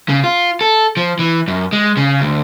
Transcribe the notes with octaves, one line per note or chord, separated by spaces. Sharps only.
C#3
F4
A4
F3
E3
F#2
G#3
C#3
D2